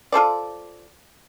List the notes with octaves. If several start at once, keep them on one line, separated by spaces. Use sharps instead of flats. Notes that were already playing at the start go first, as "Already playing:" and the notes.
F4 A4 C5 D5